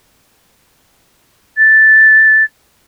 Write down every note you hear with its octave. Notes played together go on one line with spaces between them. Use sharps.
A6